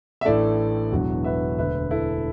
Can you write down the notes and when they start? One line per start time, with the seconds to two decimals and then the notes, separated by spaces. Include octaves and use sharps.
0.21 E5
0.25 A1 A2 A3 D4 A4 D5
0.92 E1 E2 D3 F#3 B3 F#4
1.24 B4 E5
1.58 E1 D2 D3 B4 E5
1.91 E4 A4